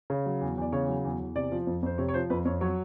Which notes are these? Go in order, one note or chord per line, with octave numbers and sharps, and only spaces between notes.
C#3
F#3
E2
E2 D5
C#3 C#5
F#3
E2
E2
C3 D5
F3
F2
F2 C5
C3 C#5
C#5
F3 C5
F2 B4
F2 C#5
F#3 C#5